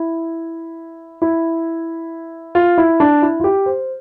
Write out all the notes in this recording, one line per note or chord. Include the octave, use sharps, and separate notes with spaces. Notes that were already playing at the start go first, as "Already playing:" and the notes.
Already playing: E4
E4
F4
E4
D4
E4
F4
G4
C5